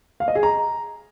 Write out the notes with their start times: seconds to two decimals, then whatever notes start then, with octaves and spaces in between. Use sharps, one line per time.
0.20 F5
0.28 D#5
0.35 G#4
0.43 A#5